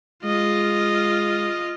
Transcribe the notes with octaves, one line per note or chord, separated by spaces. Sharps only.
G#3 F4 D#5